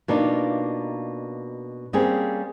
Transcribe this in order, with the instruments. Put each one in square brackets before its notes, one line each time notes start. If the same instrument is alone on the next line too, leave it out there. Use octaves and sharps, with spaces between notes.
[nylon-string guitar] B2 A#3 D4 D#4 F4
G3 A#3 C4 C#4 G#4